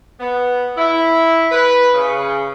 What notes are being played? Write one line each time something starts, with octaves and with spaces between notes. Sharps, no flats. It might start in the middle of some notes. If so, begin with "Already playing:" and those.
B3
E4
B4
C#3